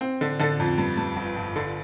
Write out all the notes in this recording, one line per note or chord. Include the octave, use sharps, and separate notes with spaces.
C4
D3
D3 A4
F2
G2
G2
G1
G1
D3